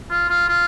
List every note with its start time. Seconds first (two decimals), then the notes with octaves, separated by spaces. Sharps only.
0.10 F4
0.29 F4
0.49 F4